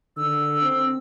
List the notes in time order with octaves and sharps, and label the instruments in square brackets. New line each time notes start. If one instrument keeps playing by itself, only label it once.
[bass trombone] D3 [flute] E6
[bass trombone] C4